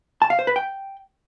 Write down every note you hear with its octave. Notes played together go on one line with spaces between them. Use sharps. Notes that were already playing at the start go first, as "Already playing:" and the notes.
A5
F5
C5
B4
G5